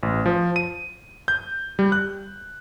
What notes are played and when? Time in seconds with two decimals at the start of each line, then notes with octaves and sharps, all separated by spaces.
0.03 A1
0.26 F3
0.56 D#7
1.28 G6
1.79 G3
1.92 F#6